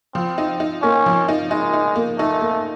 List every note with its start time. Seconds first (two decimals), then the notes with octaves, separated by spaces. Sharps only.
0.15 F3 C4
0.38 D#4
0.60 D#4
0.82 A#3 C#4
1.06 F3
1.29 D#4
1.50 G#3 D#4
1.73 D#4
1.96 A#3
2.18 A3 D#4
2.41 A#3